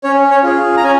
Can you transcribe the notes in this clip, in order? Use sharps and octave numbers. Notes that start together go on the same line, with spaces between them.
C#4 C#5
C#5
F4 G#4
A#5
C#4 G#5